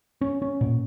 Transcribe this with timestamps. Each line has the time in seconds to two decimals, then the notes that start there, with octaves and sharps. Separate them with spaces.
0.21 C#4
0.42 C#4
0.61 A#2